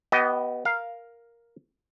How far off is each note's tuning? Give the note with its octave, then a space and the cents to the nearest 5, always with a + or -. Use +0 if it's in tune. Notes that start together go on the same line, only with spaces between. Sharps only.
B3 +0 G4 -35 D#5 +5
A#4 +5 F5 +0